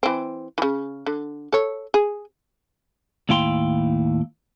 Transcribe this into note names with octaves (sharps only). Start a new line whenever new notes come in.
E3 C4
C#3 E3
D3
A4 C#5
G#4
D#2 A2 E4 F5 G5 C6